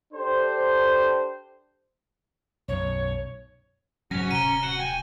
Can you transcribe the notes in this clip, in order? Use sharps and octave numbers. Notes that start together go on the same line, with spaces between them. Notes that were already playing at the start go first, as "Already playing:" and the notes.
D4 G4 A4 C5
B1 F#2 C#5
G#2 F#3 C#4 F#4 G#5 A#6
D1 C3 A#5 D#7 G7
F#4 F#5 E7
G5 G#5